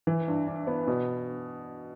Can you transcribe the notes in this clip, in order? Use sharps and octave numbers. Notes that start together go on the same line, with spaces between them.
E3
G2
D4
B3
B2